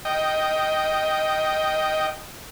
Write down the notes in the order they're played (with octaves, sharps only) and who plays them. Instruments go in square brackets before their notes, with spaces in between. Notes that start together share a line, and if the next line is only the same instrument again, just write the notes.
[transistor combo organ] D#5 G5